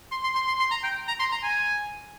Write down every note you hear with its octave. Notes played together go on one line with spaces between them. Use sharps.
C6
C6
C6
C6
C6
A#5
G5
A#5
C6
A#5
G#5